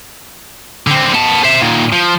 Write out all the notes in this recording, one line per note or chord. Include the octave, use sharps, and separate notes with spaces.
D3 C4
B3 A5
C5 E5
A#2 D#3
F3